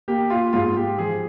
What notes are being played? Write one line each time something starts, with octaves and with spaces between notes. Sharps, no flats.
A#3 G4
F4
G#2 F4
G4
F3 G#4